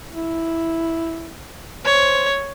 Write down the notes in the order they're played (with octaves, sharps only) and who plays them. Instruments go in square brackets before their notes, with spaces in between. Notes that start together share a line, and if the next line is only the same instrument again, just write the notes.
[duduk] E4
[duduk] C5 [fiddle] C#5